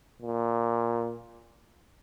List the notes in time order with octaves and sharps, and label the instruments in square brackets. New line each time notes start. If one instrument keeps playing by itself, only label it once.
[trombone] A#2